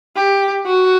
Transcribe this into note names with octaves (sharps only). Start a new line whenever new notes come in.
G4
F#4